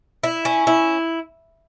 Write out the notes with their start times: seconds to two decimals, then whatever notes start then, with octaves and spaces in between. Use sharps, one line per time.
0.24 E4
0.45 C#4
0.67 E4